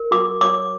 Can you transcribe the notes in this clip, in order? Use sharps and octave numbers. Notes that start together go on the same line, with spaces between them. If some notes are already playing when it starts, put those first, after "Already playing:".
Already playing: A#4
F#4 D6
C#5 D6